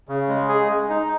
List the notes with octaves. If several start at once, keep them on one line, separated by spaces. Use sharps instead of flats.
C#3
G#3
G#4
G#3
D#4